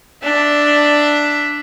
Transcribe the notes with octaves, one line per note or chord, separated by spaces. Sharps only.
D4 E5